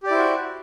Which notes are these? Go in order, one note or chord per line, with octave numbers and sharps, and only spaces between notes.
E4 F#4 G4 C5 D5